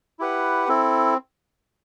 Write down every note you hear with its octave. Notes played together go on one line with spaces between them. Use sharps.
E4 G4 B4 F#5
C4 E4 A4